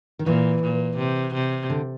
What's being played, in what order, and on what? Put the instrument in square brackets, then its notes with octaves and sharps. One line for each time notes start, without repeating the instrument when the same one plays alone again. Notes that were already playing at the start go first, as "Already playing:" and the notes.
[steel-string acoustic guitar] D#3
[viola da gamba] A#2 [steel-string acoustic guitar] E3
[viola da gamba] A#2
C3
C3
[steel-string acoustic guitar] D3